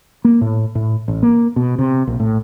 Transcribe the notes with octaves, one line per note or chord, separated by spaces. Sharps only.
A#3
A2
A2
A1
A#3
B2
C3
A#1
A2